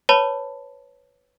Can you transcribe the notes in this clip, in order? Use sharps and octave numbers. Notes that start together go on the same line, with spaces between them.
B4 C#5 A5 B5